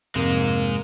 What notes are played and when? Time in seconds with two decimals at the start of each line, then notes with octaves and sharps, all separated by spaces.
0.16 F2 G#2 C3 G#3 A#3